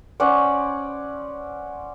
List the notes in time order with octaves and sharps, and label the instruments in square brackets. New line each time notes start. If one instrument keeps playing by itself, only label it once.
[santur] C#4 C5 D5 F#5